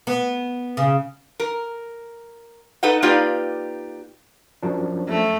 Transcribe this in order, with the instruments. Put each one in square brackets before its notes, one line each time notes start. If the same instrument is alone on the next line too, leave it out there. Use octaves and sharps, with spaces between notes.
[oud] B3
C#3
[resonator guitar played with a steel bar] A#4
D#4 A4 B4 D#5 F#5
A#3 D#4 F4 G4 B4 D5
[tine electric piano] F#2 F3 D4
[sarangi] A3